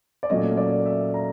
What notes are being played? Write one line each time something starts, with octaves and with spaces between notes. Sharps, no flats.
D5
A#2 F#3 A3 C#4 D#5
D5
E5
A#5